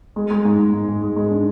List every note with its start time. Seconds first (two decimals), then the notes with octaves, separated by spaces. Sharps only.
0.16 G#3
0.31 G#3
0.45 G#2
0.59 G#2
0.73 G#2
0.88 G#2
1.02 G#3
1.16 G#3
1.31 D4